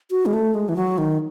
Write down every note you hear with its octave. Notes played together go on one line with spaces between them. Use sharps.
F#4
G#3
A3
G#3
E3
F#3
D#3